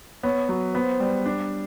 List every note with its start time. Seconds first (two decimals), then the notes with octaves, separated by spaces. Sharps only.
0.23 B3 C#5
0.49 F#3
0.75 B3 C5
1.00 G3
1.26 D4